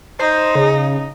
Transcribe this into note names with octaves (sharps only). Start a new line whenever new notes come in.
D#4 C5
C#3